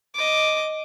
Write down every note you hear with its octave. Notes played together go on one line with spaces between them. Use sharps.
D#5 D6